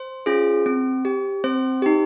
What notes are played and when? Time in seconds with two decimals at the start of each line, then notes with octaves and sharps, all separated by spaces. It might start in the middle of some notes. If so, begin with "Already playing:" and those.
Already playing: C5
0.26 C#4 F4 G#4
0.66 C4
1.05 G4
1.44 C4 C5
1.82 D#4 G4